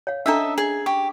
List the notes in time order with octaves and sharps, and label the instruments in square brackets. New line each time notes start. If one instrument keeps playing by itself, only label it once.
[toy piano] C#5 F5
[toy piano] C#4 D4 A#5 [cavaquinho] A4 D#5 E5
[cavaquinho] G#4 G#5
[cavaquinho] G4 [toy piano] C#6